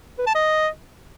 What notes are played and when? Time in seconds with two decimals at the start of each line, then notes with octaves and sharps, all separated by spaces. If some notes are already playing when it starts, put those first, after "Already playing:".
0.19 B4
0.27 A5
0.35 D#5